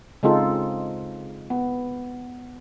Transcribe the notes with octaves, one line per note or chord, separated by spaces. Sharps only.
C#3 G#3 C4 D#4 F4 A4
B3